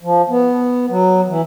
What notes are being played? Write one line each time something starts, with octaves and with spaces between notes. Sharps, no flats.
F3
B3
F#3
E3